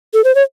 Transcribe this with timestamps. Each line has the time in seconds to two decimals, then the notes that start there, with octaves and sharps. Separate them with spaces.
0.14 A4
0.24 C5
0.35 C#5